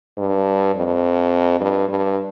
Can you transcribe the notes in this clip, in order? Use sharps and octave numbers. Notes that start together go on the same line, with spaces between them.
G2
F2
G2
G2